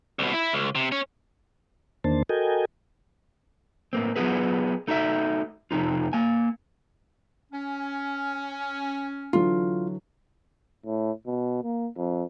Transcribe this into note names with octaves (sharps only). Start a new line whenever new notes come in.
C2 B2
E4
C#2
C3
C#4
E2 D#3 A#3 D4 C5 A5
F#4 A4 A#4 D#5 G5 G#5
A2 A#3 C4
F#3 B3 F4 F#4 G#4 B4
A3 D#4 F#4 D5 E5
F2 C3 D#3 D#4 F4
A#3 G#5
C#4
D3 E3 F#3 F4
A2
B2
A#3
F2